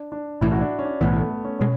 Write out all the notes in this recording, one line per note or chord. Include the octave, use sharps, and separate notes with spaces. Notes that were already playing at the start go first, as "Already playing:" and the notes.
Already playing: D4
D4
B1 A2 E3 E4
F#4
D4
C#4
D4
B1 A2 E3 B3
A3
A3
C#4
B2 G#3 C#4